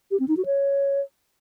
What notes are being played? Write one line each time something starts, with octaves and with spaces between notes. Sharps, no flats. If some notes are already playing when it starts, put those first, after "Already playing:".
G4
C4
D#4
F#4
C#5